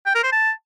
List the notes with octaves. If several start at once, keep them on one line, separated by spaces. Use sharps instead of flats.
G5
A#4
C5
A5